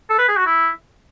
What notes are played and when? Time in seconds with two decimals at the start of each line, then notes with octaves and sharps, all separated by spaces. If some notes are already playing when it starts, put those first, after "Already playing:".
0.09 A4
0.19 B4
0.28 G#4
0.37 F#4
0.46 E4